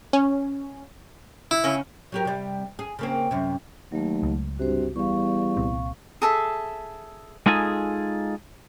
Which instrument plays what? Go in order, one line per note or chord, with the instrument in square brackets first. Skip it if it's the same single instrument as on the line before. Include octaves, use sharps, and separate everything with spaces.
[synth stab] C#4
[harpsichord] E4
[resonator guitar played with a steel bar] A2 C#3 C#4
[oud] F#3 G4 A#4
C3 G3
G#4
C#3 A#3 C4
F#2 C3
[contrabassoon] D#2 [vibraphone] F#3 A3
[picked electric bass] C#2
[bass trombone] G2 [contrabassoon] C3 [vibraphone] F#4 C5
[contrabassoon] E2 [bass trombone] G3 [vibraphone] F5 C#6
[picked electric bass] C2 A#2 C4
[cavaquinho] G#4 A4 E5
[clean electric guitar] G#3 D#4 F4 G#4 A4 G#5